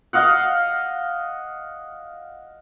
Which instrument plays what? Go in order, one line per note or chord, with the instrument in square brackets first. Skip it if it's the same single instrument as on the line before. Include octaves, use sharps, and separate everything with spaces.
[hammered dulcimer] D#5 F5 F#5